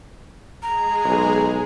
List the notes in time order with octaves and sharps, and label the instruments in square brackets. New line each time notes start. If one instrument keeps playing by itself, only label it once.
[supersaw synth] G#3 G#4 [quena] A#5
[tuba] B1